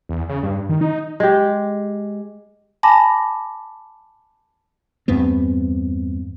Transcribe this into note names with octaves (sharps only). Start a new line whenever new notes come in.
E2
C#3
G2
D#3
D#4
G#3 G4
G#5 A5 B5 D6 A#6
E2 G2 B3 C4